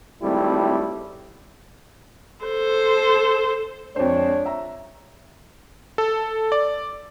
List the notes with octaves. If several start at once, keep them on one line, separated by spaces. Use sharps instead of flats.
G#1 G3 A3 C4 E4
A4 C5
F2 G#3 D4 C5 C#5
E5 A#5
A4
D5